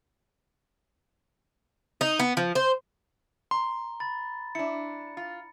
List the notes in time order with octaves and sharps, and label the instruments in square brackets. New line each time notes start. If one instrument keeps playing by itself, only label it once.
[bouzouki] D#4
B3
F3
C5
[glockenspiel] A#5 [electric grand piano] C6
[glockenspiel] B5 A6
[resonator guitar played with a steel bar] D4 E4 [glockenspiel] C#7
[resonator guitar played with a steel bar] F4